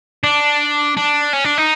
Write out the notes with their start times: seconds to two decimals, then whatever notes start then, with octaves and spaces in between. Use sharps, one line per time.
0.24 D4
0.97 D4
1.33 C#4
1.45 D4
1.58 D#4